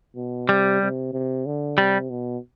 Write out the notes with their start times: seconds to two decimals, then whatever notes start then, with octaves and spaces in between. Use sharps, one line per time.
0.16 B2
0.48 C3 G3
0.82 C3
1.13 C3
1.46 D3
1.78 C3 G3
2.10 B2